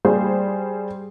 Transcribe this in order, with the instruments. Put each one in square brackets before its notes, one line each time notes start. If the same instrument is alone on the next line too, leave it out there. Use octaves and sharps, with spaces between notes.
[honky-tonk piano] G3 G#4 C5